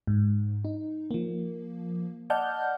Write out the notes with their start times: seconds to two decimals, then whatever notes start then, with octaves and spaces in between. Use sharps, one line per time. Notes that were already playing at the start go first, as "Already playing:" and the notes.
0.07 G#2
0.65 D#4
1.11 F3 A#3
2.30 D5 D#5 F#5 A5 F6 G6